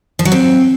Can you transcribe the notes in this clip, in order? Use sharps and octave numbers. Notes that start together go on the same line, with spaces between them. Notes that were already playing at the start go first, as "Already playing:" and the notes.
F3
F#3
C4